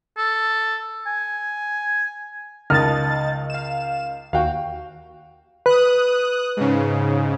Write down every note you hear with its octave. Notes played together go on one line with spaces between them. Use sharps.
A4
G#5
C#2 D#3 D#5 A5 F6 A6
F5 E7
D#2 F#4 F5 G5
B4 D#6 F#6
G#2 C#3